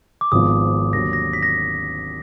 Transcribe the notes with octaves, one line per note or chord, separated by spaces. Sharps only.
D6
G#1 G#2 F3 B3 F4 D#6
D#2 D3 F#3 A#6
A#6
B6
A#6